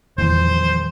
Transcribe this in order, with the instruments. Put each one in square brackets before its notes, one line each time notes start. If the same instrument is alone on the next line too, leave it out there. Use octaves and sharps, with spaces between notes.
[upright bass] E2 F3 [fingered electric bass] D#3 G3 [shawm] C5